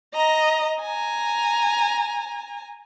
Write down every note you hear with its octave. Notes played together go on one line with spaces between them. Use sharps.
D#5 A#5
G#5 A#5